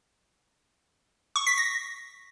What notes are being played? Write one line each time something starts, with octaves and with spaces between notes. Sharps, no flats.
C#6
B6
A#6